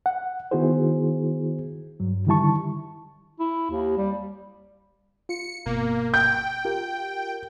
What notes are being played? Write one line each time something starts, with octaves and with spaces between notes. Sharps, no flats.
F#5
D#3 B3 E4 F#4 G#4 C5
G2 F#3
D3 D#3 G3 E4 A5 C#6
E4
D#2
G3
F4 C#7
G1 B2 A#3
G5 G6
F4 G4 A#4